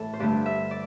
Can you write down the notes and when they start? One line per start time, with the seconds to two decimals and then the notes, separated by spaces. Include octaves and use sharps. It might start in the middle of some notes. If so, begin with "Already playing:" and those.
Already playing: A2 E3 A4
0.13 C5
0.20 G2 D3 A3 D5
0.46 E5
0.71 D5